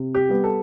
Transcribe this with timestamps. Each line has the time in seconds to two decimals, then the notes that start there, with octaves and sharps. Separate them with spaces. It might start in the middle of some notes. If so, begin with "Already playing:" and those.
Already playing: C3
0.15 G4
0.29 G3 B3
0.44 A4